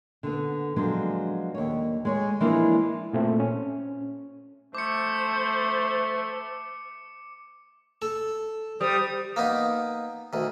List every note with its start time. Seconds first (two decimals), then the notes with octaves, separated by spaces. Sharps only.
0.23 D3 B3
0.76 F3 F#3 G#3 B3 D4
1.55 D#2 C#5
2.05 G#3 C#5
2.40 E3 F3 G#3 A#3 D4 E4
3.13 A#2 A3 C4
3.40 C#4
4.75 A3 C5 D6 C#7
8.02 A4
8.81 G3 C5 D#6
9.36 A#3 B3 D#4
10.33 D2 D#3